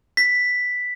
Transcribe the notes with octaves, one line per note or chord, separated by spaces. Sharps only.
B6